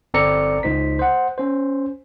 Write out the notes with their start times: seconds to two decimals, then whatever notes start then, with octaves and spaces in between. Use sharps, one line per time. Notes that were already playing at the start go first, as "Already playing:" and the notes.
0.14 G1 C4 A4 D5 A#5 C#7
0.63 C#2 D#4 C5 B6
0.99 C5 F#5
1.38 C#4 C5